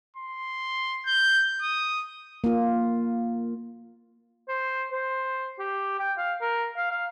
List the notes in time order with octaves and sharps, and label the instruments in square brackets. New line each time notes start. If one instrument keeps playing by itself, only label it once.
[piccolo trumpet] C6
G6
D#6
[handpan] A#3 F4
[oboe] C5
C5
G4
G5
F5
A#4
F5
F5